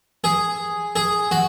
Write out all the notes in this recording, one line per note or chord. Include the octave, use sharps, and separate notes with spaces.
G#4
G#4
F#4